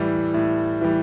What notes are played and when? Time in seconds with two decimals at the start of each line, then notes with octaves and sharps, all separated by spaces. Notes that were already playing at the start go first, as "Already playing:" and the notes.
Already playing: A2 E3 G3
0.34 A2
0.81 E3 G3